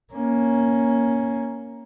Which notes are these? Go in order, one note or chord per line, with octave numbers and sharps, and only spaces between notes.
A#3 C#4